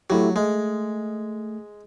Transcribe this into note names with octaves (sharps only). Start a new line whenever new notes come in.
F#3 A3 E4 G4
G#3 A3